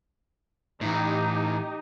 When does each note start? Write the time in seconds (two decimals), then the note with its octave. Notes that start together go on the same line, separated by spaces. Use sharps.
0.81 A2 E3 D#4 G4